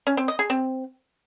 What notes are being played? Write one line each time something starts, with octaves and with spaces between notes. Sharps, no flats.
C#4
C4
D#5
G#4
C4